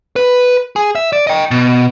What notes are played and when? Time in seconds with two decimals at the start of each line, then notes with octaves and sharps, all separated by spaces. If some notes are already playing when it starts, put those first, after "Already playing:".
0.16 B4
0.76 G#4
0.95 E5
1.13 D5
1.27 D#5 G5
1.51 B2